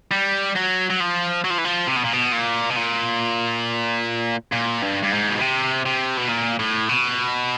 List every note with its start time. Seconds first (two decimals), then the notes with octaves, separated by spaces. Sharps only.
0.12 G3
0.56 F#3
0.90 F#3
1.00 F3
1.44 F#3
1.50 F3
1.58 E3
1.65 F3
1.87 C3
1.96 B2
2.04 A#2
2.13 B2
2.32 A#2
2.70 B2
2.76 A#2
4.53 A#2
4.83 G2
5.03 G2
5.12 G#2
5.30 B2
5.41 C3
5.86 C3
6.18 B2
6.29 A#2
6.59 A2
6.89 B2